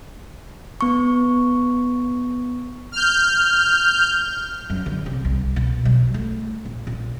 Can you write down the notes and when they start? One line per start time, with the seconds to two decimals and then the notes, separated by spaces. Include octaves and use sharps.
0.81 B3 C#6
2.92 F6 G6
4.70 F#2
4.86 D3
5.06 C3
5.25 C2
5.56 B2
5.85 F#3
6.14 A3
6.65 A#1
6.87 A#2